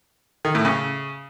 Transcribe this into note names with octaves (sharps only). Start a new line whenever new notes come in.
D#3
A2
C#3